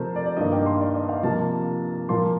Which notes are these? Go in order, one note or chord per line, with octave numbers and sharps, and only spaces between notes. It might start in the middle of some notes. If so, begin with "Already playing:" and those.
Already playing: C3 F3 A3 A#4 C5 A5
D5
D5
G2 D#3 A#3 D#5
G5
C6
D5
D#5
F5
C3 F3 A#3 A5
A#2 F3 A#3 C6